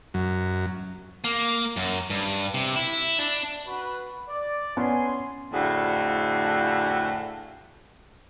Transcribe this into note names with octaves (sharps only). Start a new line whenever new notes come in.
F#2
A#3
F#2
G2
C3
E4
D4
F#4 B4
D5
B3 C#4 G#5 C6
F2 A2 D3 F#4 G#4